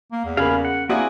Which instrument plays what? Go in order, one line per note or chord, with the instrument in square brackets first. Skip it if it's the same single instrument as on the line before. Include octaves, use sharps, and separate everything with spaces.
[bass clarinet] A#3
E2
[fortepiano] C#3 A#3 [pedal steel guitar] F5 G#5 B5
[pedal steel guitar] F#5
[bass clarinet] A#3 [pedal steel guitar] C4 G#4 G#5 [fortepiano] E4 F#4 D5